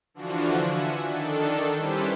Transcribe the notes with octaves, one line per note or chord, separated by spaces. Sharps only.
D3 E3 F3 D4 F4 F#4
E5 F#5 G#5
D#3 D4 A4
G3 C#4 E4 G4 B4 C5